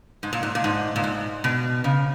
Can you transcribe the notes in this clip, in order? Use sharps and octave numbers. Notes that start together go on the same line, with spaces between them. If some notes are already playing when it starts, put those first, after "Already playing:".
G#2
A#2
G#2
A#2
G#2
A#2
G#2
B2
C#3